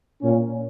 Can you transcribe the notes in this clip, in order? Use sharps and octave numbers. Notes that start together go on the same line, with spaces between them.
A#2 C#4